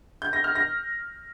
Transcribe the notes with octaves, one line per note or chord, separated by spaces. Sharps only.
G6
A#6
F6
A#6